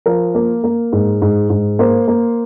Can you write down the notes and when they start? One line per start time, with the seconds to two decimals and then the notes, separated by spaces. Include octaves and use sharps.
0.06 F3 A#4
0.35 A#3
0.64 A#3
0.92 G#2
1.22 G#2
1.50 G#2
1.79 A#3 C5
2.08 A#3